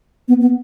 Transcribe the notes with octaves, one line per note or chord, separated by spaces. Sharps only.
B3
B3